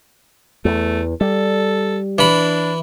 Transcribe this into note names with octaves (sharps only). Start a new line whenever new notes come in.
E2 A3
G3 A4
E3 D4 B5